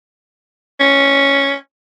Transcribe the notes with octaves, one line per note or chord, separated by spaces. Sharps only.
C#4